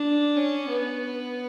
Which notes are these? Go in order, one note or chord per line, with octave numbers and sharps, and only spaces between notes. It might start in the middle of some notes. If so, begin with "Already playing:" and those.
Already playing: D4
C#4
B3